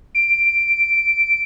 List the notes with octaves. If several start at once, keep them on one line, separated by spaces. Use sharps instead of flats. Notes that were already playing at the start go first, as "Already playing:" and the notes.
D7